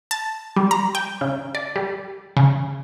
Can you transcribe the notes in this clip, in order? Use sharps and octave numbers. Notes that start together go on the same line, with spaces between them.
A5
G3
A#5
G5
C#3
D5
G3
C#3